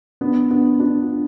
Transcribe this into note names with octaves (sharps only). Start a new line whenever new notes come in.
B3 D4
B3 D4
D4 F4